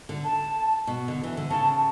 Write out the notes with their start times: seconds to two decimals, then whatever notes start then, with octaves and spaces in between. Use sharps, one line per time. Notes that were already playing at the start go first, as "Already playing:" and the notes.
0.09 D3
0.25 A5
0.87 B2
1.08 D3
1.24 E3
1.37 D3
1.50 C#3 A5